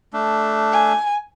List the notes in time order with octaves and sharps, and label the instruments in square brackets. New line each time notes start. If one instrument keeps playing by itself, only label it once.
[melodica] A3 D4
[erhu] G#5